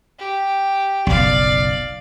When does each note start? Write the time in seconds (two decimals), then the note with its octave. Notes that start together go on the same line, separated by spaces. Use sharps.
0.18 G4
1.07 F#1 B1 D5 F5